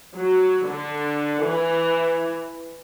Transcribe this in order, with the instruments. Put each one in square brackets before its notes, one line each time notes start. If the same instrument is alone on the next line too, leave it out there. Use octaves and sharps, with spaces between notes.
[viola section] F#3
D3
E3